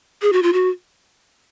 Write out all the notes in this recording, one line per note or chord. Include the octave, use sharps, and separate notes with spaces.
G#4
F#4
F4
F#4